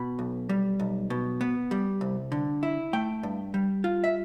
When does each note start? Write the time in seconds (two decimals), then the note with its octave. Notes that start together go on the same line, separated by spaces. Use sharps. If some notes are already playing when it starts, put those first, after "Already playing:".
Already playing: B2 B5
0.19 B1
0.49 G3
0.80 B1
1.10 B2
1.41 B3
1.71 G3
2.01 C2
2.32 D3
2.63 E4
2.93 A3 G5
3.23 G2
3.54 G3
3.84 F4
4.04 E5